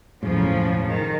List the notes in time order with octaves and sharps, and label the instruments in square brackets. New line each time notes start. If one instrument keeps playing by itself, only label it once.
[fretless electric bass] E1 F#2 A2 [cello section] C#3 F3 F#3
[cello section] D#3